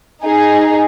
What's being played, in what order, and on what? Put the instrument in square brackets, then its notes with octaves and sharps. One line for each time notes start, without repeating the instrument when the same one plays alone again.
[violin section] D#4 G#4